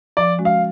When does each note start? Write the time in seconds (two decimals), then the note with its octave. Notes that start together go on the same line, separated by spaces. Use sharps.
0.17 F3 D5
0.38 G#3 C#4 F#4
0.45 F5